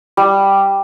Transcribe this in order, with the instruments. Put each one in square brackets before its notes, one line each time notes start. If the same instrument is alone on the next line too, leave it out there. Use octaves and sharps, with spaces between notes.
[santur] G3